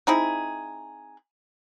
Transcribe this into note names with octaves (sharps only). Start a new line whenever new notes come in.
C4 D#4 E4 G#4